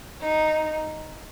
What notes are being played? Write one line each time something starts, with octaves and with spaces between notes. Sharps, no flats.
D#4